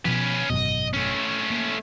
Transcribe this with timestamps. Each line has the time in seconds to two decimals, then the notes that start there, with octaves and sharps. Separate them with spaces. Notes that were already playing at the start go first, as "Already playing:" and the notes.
0.05 B2 F3 C#4 B4
0.50 G#1 F#2 B2 D#5
0.94 A3 C#4
1.50 A#3